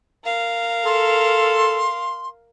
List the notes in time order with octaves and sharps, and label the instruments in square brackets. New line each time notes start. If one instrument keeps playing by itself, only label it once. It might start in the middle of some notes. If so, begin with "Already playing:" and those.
[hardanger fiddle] A#4 F5
[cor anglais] A4 [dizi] C6